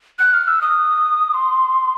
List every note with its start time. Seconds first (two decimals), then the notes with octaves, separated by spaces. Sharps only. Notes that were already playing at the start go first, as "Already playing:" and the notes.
0.19 F#6
0.34 F6
0.48 E6
0.62 D#6
1.34 C6